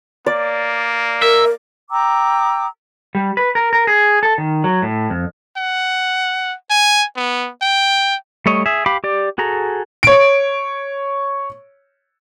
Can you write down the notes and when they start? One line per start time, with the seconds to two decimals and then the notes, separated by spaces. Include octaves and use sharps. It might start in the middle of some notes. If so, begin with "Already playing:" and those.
0.26 A#3 D5
1.22 A#4 E5
1.90 G5 A#5 D6 E6
3.15 G3
3.37 B4
3.55 A#4
3.73 A#4
3.87 G#4
4.23 A4
4.38 D#3
4.64 F#3
4.82 A2
5.10 F2
5.57 F#5
6.70 G#5
7.16 B3
7.62 G5
8.46 G3 A3 C#5 D#5
8.66 G#4 E5
8.86 G4 F5 B5 D6
9.04 G4 D5
9.38 F#4 G#4 A4 A#5
10.03 C#5 D7